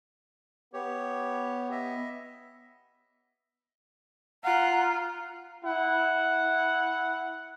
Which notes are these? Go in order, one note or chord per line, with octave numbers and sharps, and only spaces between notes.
B3 G4 C#5
D#5 E5
F4 F#5 A#5
E4 F#5